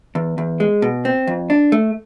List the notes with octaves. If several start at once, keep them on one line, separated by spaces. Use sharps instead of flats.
E2
E2
G#3
B2
C4
F2
D4
A3